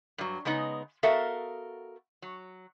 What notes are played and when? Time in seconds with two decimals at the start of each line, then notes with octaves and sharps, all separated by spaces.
0.18 G2 F#3
0.45 C#3 G#3 B3 D#4
1.03 B3 F#4 A4 A#4 E5 F5
2.22 F#3